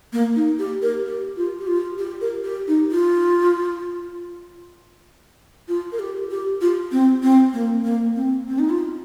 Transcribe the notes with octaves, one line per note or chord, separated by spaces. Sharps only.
A#3
D#4
G4
A#4
G4
F4
G4
F4
G4
A#4
G4
D#4
F4
F4
A#4
G4
G4
F4
C4
C4
A#3
A#3
C4
C4
D#4
F4